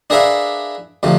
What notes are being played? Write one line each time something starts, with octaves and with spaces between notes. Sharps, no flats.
D4 G#4 A#4 B4 E5 F5
D2 C3 F3